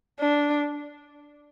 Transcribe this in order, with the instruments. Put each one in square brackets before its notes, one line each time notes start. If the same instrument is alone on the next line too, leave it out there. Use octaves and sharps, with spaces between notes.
[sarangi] D4